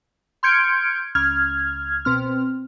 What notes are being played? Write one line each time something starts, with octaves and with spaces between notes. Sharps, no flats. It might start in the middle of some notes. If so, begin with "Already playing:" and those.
C6 F6 G6 G#6 C#7 D7
C#2 F6 G#6
B2 C4 F6